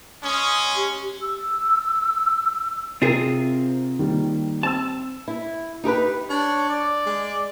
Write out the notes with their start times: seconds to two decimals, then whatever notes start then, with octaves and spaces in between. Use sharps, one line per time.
0.24 G#3 C#4 D#6
0.76 G4
1.22 E6
3.02 C3 C4 F4 G#4 A#4
3.99 D#3 G3 A#3
4.63 C4 A5 E6
5.28 E4
5.84 D#4 G4 A#4 B4
6.30 D4 C#5
6.69 D5
7.06 G#3